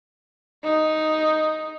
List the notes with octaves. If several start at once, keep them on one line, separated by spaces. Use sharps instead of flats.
D#4